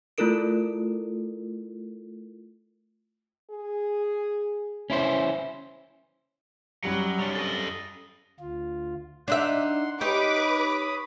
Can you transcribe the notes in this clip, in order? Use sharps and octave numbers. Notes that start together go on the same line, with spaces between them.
A3 E4 F4 A4 A#4 D7
G#4
E3 C#4 E4 C5
F#2 F#3 G3 F#7
C#4 D4
A4 D#5
D2 F4
D4 D#4 E5 F#5 C6
D#4 G4 B4 C#5 B5 D6 D#6